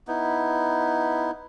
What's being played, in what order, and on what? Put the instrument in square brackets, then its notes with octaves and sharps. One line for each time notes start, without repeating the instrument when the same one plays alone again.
[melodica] B3 D#4 E4